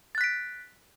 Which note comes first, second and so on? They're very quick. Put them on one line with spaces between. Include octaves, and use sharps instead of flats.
A6 F#6 B6 D7